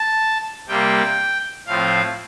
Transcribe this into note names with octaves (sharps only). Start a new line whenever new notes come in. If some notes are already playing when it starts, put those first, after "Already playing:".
Already playing: A5
C3 G3 A#3 G5
A2 F3 C4 F5